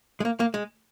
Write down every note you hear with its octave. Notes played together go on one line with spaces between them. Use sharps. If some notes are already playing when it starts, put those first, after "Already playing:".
G#3
A#3
A#3
G#3